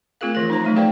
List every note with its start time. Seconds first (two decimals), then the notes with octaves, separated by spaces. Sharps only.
0.21 A3 C4 F4 G#4 A#4 F5
0.35 E3 F3 A#4
0.50 D#4 C5 A#5
0.64 F#3 A3 E5
0.76 G#4 B4 C5 D5 F5 G5